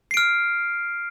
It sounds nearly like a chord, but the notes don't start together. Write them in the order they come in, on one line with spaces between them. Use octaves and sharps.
C7 D7 F6